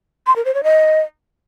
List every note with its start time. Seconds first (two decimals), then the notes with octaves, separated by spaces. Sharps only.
0.27 C6
0.36 A#4
0.45 C5
0.54 C#5
0.64 D#5